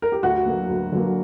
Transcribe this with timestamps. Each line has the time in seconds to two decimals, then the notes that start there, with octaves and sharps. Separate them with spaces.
0.02 A#4
0.12 G4
0.23 D2 F#4
0.46 D3 F#3 A#3
0.69 D2
0.92 D3 F#3 A#3